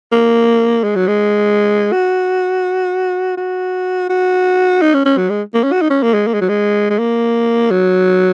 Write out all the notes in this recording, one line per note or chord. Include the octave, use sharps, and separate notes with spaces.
A#3
G#3
F#3
G#3
F#4
F#4
F#4
D#4
C#4
C#4
F#3
G#3
A#3
C#4
F#4
D#4
C#4
A#3
G#3
A#3
G#3
F#3
G#3
G#3
A#3
F#3